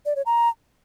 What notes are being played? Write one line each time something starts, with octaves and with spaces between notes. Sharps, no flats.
D5
C#5
A#5